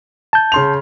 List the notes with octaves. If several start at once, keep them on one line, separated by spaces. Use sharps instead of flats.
A5 G6
C#3 C6 F7